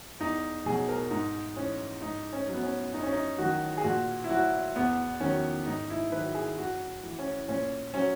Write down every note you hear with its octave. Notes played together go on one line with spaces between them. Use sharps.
E2 D#4
B2 F#3 G#4
A#4
G#2 D#4
E3 C#4
G#2 D#4
C#4
F#3
B3
C#4
F#2 D#4
C#4
D#4
D#3 F#3 F#4
G#4
A#2 F#4
E4
F#3 F#4
E2 B3
D#3 C#4
F#3
G#2 D#4
E4
D#3 F#3 B4
G#4
F#2 F#4
E3
C#4
A#2 C#4
F#3 C#4